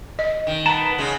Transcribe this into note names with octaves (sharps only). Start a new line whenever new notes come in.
D#5
D#3
B4 F#5 A5 A#5
C#3 G#3 F#5